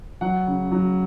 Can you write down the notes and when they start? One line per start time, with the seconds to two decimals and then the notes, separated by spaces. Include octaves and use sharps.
0.21 F#3 F#5
0.47 C#3
0.71 F#3